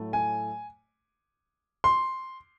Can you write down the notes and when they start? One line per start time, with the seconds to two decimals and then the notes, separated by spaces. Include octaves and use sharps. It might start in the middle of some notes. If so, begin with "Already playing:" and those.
Already playing: A2 F#3 A3
0.13 G#5
1.84 C6